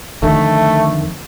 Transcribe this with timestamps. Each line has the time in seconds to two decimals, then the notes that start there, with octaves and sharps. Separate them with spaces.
0.23 F2 D3 D#3 A3